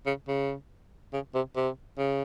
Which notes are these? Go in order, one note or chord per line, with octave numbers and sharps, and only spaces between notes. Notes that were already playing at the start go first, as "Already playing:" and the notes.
C#3
C#3
C#3
C3
C3
C#3